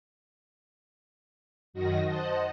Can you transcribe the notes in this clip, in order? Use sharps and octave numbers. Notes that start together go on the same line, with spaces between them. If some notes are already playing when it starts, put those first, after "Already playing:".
F#2 D#3 F#4 D#5 A#6
C5 D#5 F#5 A5